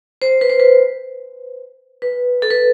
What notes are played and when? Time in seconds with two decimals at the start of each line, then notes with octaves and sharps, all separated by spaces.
0.22 C5
0.41 B4
0.50 C5
0.60 B4
2.02 B4
2.42 A4
2.51 B4